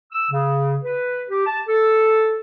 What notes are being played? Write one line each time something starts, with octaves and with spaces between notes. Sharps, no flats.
E6
C#3
B4
G4
A5
A4